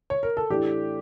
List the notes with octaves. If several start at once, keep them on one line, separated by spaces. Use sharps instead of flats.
C#5
A#4
A4
A2 E3 A3 D4 G4